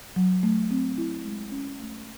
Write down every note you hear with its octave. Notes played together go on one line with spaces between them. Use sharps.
F#3
A3
C4
E4
G#3
C#4
A3